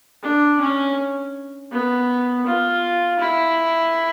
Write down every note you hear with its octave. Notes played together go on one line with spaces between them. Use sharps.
D4
C#4
B3
F4
E4